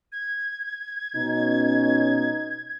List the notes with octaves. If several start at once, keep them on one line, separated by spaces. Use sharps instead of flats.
G#6
B2 C#4 D#4